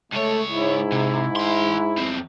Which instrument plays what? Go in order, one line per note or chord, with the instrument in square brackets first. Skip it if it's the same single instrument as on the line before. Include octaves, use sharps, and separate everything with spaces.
[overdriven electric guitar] C#2 C#5 [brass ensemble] A3
[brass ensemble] G#2 E4
[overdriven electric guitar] C3
A3 C6
E2 C4